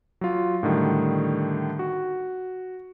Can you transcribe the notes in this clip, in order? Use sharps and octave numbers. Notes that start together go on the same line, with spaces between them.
F#3 F4
A2 D3 D#3 G3
F#4